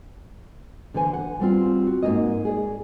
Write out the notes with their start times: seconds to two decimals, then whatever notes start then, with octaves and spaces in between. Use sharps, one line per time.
0.94 D3 E3 C5 G#5
1.13 F#5
1.40 G3 C4 F4
1.87 F#4
2.03 G#2 B2 A#3 D#5
2.45 G#4 D5